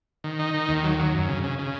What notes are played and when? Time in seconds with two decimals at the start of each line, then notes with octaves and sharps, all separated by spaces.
0.24 D#3
0.39 D#4
0.54 D#3
0.69 D#2
0.84 F#3
0.99 F#3
1.14 F#2
1.29 C#3
1.43 C#3
1.59 C#3